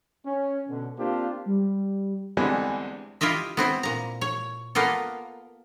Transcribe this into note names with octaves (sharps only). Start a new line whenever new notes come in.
C#4
B2 D3
A#3 C4 D4 F4 G4 C5
G3
E2 D3 E3 G3 G#3 C4
E4 F4 G4 D#5 E5
B3 C4 E4
A#2 A#5
C#5
A#3 B3 F4 A4